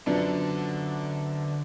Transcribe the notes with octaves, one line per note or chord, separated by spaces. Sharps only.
F#2 D3 F3 B3 D4